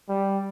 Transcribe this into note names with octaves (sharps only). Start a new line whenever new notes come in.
G3